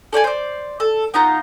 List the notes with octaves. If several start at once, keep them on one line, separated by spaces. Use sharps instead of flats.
A4 D5 G5 G#5
C5 D5
A4
B3 D#4 F4 A#5